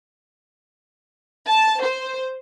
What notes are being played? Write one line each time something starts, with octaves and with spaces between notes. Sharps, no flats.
A5
C5